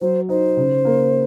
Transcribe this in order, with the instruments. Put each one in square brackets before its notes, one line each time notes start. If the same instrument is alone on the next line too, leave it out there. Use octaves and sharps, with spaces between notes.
[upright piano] F#3 [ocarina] C5
[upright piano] D#4 [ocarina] C5
[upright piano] C#3
A#3